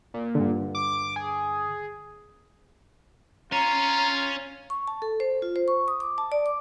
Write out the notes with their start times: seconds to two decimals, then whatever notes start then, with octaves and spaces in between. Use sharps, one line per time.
0.14 A#2
0.35 G2 D3
0.75 D6
1.16 G#4
3.52 C#4 F4 C#5 A#5
4.70 C#6
4.88 A5
5.02 A4
5.20 C5
5.42 F4
5.56 C5
5.68 C#6
5.88 D#6
6.00 D6
6.18 A5
6.32 D5
6.46 D6